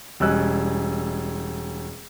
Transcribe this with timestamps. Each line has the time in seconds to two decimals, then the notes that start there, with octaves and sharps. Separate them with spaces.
0.20 E1 G3 C#4 D#5 E6 F#6